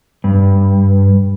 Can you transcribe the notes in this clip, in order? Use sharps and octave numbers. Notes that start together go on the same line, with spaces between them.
G2